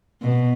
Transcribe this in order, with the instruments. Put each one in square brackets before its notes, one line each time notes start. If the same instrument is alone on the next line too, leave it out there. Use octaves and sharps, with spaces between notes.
[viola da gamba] B2